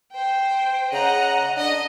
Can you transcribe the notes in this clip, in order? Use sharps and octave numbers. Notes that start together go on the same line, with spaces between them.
C5 G5
C#3 D#5 F#5 A#5
D4 D#5